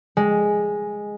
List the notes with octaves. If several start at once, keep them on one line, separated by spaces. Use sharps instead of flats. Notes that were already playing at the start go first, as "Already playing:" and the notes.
G#3